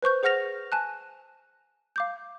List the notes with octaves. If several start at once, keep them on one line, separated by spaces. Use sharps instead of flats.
B4 C5 C#6 G6
G#4 C5 F#5 F6 A#6 F7
G#5 A5 F#6
F5 D6 G6